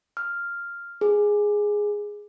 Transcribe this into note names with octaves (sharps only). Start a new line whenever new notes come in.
F6
G#4